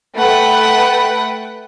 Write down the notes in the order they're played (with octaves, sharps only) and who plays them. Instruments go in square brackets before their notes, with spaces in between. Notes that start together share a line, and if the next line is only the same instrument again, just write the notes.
[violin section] A3 B4 F#5 G5